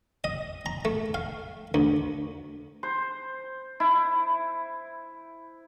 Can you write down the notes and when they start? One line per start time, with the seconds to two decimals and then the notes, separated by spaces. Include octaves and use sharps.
0.24 D#5
0.66 A#5
0.85 A3
1.14 F5
1.74 D2
2.83 C5
3.80 E4